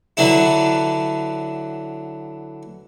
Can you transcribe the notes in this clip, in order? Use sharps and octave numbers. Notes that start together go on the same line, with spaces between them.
D3 E3 F#3 D4 E4